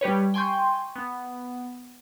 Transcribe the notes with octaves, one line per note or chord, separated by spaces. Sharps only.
G3 G4 B4 C#5
G5 G#5 C6 C#6 G6
B3